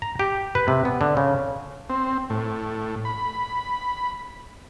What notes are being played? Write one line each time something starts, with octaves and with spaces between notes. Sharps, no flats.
A#5
G4
B4
C3
B3
D3
C#3
C4
A2
B5